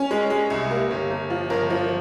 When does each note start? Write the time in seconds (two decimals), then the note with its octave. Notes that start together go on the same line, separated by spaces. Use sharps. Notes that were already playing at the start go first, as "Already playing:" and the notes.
Already playing: C#4
0.11 G#3
0.30 G#3
0.50 C2
0.71 A#3
0.91 G1
1.10 G1
1.30 F3
1.50 G1 A#4
1.70 F3